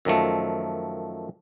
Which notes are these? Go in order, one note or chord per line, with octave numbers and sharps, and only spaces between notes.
F#2 D#3 F3 A3